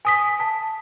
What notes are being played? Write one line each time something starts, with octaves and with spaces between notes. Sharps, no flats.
G#5 D#6 B6
A5